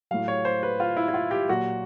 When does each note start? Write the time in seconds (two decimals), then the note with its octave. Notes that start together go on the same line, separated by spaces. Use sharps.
0.11 A2 F#3 F5
0.28 C#5
0.45 C5
0.63 B4
0.80 F4
0.97 E4
1.08 E4
1.14 F4
1.31 G4
1.49 A#2 F#3 F#4